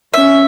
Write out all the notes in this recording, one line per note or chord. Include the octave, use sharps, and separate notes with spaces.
C#4 E5